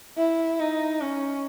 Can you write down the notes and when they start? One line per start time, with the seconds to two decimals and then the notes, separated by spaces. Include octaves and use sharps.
0.18 E4
0.60 D#4
1.01 C#4